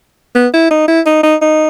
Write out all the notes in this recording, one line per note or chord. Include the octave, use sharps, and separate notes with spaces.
B3
E4
D#4
E4
D#4
D#4
D#4